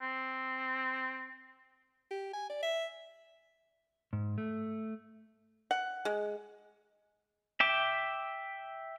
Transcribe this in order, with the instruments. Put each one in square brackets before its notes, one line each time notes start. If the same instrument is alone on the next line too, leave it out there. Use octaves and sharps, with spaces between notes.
[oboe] C4
[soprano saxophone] G4
G#5
D5
E5
[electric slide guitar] G#2
A3
[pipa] F#5
G#3
[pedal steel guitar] E5 G5 D6